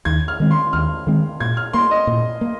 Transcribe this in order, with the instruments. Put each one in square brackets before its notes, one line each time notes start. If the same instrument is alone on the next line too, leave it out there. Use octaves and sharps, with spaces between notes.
[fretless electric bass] D#2 [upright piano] G#6
[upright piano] F6
[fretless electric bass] D#3 G#3 C4
[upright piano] C6
[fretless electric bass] D#2 [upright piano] F6
[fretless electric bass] D#3 G#3 C4
[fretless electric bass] A#2 [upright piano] G#6
[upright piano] F6
[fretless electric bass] A#3 [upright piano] C6
[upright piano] D#5
[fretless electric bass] A#2
A#3